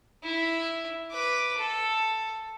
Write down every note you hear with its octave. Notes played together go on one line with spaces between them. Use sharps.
E4
B4 D6
A4